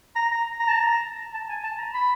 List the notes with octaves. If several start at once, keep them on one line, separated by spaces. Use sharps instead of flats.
A#5
A#5
A#5
A5
A#5
A5
G#5
A5
A#5
B5